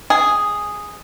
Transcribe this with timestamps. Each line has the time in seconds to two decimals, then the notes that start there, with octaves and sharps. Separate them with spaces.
0.10 G#4